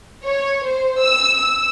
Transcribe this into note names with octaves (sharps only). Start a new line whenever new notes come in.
C#5
C5
E6
E6